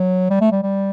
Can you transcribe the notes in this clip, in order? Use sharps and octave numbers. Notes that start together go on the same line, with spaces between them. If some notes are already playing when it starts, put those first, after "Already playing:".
Already playing: F#3
G3
A3
G3
G3